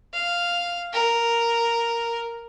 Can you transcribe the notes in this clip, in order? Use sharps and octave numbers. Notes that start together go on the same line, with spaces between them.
F5
A#4